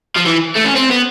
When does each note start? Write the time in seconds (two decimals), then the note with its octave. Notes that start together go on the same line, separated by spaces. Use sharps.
0.16 F3
0.27 E3
0.56 A3
0.65 C#4
0.76 C4
0.91 B3